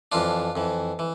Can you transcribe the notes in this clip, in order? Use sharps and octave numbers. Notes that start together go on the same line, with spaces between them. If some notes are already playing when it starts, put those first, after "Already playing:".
F2 E3 D4 F4
F2 E3
E3